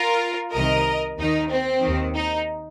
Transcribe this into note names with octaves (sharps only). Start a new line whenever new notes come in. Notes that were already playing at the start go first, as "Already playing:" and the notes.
Already playing: F4 A#4
C2 C3 D#3 A#4 D#5
D#2 D#3 D#4
C4
D#3
D#2
D#4